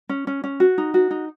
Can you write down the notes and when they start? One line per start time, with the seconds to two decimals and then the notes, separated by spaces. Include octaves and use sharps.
0.09 C#4
0.27 C#4
0.44 C#4
0.60 F#4
0.78 D#4
0.94 F#4
1.11 D#4